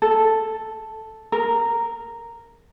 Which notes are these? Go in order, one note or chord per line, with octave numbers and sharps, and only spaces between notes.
A4
A#4